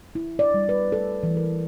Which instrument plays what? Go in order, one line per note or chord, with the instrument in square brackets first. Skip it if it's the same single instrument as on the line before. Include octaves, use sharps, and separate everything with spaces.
[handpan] E4
D5
G3
B4
A4
E3
A#4